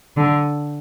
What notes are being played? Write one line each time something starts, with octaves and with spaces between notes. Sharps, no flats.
D3